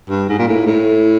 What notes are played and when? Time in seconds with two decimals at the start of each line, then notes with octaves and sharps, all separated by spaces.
0.10 G2
0.29 G#2
0.39 A#2
0.47 A2
0.67 A2